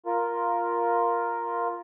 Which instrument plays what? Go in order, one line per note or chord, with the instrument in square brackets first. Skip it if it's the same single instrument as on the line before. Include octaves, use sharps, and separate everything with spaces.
[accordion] F4 A#4